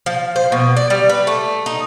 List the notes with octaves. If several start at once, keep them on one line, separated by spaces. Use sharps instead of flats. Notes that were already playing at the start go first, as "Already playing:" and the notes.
F3
C5
B2
D5
G3
B4
A3
D#4